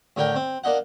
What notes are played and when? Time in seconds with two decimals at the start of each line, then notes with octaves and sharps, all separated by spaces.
0.16 A2 D3 D4 A#4 G5
0.36 C4
0.64 A#3 D4 D#5 F#5